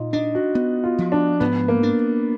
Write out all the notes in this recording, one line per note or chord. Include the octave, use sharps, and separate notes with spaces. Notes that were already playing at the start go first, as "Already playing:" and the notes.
Already playing: A#2 D#4 F4
D4 D#4
F#4
B3
F4
F3
D4
G#2 B3
A#3
D4